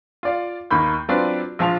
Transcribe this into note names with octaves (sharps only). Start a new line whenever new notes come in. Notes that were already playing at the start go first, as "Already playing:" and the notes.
F4 D5 F5
D#2 D#3 A#3 B5 G6
F#3 C4 D4 F4 B4 D5
A#1 F3 F5 A5 C6 F7